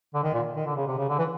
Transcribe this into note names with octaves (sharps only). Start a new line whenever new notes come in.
D3
D#3
A#2
D#3
D3
C#3
C3
C#3
D3
E3